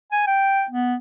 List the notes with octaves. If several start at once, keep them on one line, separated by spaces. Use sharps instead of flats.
G#5
G5
B3